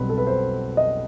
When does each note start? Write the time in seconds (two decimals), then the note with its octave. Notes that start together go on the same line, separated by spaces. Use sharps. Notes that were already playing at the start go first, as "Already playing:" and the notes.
Already playing: B1 B2 G3 C4 B4
0.09 A4
0.18 B4
0.27 C5
0.77 D#5